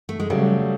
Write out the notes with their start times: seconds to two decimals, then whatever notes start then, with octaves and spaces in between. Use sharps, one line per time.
0.09 A3
0.20 G#3
0.30 C#3 F#3 G3 A3